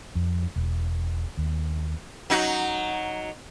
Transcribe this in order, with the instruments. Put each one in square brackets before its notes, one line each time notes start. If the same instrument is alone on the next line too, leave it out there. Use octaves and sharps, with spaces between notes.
[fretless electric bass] F2
E1
D#2
[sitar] F#3 D#4 F#4